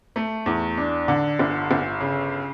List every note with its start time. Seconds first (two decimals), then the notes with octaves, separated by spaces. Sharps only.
0.16 A3
0.46 E2
0.78 D4
1.08 D3
1.39 G1
1.71 G1
2.00 C#3